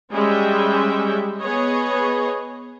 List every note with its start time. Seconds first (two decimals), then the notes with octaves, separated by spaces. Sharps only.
0.11 G3 G#3 C#4 E5 G5
1.40 B3 G#4 B4 C#5 D#5